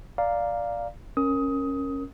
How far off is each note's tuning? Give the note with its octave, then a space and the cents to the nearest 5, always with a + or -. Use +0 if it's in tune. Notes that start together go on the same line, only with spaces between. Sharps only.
D5 +0 F5 +0 A#5 +0
C#4 -15 A#4 +0 D#6 +20